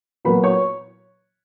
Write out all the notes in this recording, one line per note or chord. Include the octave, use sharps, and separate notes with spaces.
A#2 F#3 B3 B4 B5
C#5 C#6